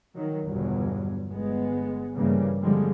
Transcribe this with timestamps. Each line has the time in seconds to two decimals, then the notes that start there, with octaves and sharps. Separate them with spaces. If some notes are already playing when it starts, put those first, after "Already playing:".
0.15 D#3 F#3
0.46 G1 E2 G2 B2 F#3
1.30 G1 G#3 B3
2.16 G2 C#3 E3 G3 A#3
2.61 F2 D3 F3 G3 G#3